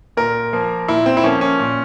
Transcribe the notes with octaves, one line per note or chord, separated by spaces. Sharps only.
A#2 A#4
F3 A#3
A#2 E4
C4
E4
F3 A#3 C#4
C#4
A#2